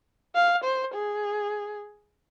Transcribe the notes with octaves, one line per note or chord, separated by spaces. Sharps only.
F5
C5
G#4